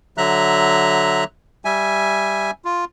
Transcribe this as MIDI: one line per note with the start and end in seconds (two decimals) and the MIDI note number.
0.18 1.24 50
0.18 1.24 54
0.18 1.24 76
0.18 1.24 82
0.18 1.24 90
1.65 2.51 55
1.65 2.51 76
1.65 2.51 80
2.65 2.85 65